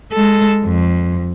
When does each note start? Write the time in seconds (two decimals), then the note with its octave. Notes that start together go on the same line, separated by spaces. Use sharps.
0.12 G#3 A4
0.64 F2